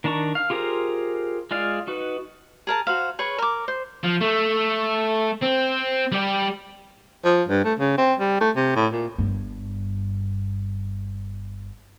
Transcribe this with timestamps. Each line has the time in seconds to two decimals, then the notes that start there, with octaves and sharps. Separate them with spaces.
0.04 D#3 D4 A5 A#5 C#6
0.35 F5
0.50 F4 G4 G#4 A#4 C5
1.51 G#3 F4 G#4 D5 F5
1.87 D#4 F#4 B4
2.67 G#4 A#4 A5
2.87 F#4 C5 F5
3.19 G#4 B4 C#5 C#6
3.38 A#4 D6
3.68 C5
4.03 F3
4.21 A3
5.42 C4
6.12 G3 G4
7.25 F3
7.48 G2
7.64 A3
7.79 C#3
7.98 C4
8.20 G3
8.41 A3
8.56 C3
8.76 A2
8.92 A#2
9.18 G1 G2